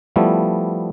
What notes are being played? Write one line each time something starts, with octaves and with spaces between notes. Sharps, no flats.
F3 G3 A3 B3 E4